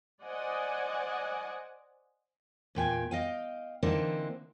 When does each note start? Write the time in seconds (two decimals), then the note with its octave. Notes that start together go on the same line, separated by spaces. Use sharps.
0.23 C5 D5 D#5 F#5 G#5
2.75 E2 A#2 G5 G#5
3.11 D#5 F5 G5
3.83 D3 E3 A#3 C4 D4 D#4